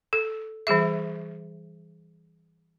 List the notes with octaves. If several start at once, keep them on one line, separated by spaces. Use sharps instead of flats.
A4
E3 G3 G#4 E5